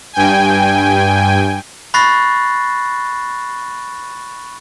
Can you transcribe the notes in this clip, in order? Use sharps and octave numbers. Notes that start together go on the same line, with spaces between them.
G2 G5 G#5
B5 C#6 F#6 A6 A#6 C7